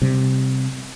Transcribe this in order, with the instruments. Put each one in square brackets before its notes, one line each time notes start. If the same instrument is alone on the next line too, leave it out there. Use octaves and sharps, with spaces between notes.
[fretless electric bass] C3 G3